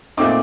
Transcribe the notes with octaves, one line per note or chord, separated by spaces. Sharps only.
A#2 A3 C4 D#4 D6